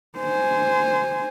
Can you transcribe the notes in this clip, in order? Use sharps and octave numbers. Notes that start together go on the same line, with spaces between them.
C5 G#5